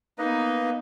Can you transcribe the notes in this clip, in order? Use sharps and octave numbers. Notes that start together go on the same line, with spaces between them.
A#3 B3 D#4 B4 D#5